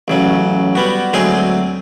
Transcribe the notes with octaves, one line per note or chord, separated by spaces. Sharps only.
A1 C#3 F#3
G3 B3 F#4
D2 F#3 G#3 C4 G#4 C6